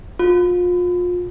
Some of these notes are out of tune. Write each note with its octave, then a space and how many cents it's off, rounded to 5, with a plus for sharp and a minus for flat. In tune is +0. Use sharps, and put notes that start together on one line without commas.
F4 +30